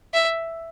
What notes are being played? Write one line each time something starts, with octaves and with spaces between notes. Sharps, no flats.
E5